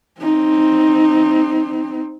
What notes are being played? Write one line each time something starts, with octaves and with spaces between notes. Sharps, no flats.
C4 D#4